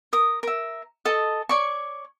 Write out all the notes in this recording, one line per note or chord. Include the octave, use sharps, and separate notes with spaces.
A#4 D#6
A#4 E5
A4 D#5
C#5 D5 C#6